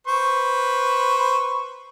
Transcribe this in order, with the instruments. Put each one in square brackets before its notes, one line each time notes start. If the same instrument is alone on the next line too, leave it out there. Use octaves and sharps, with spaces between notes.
[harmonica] B4 C5 C#6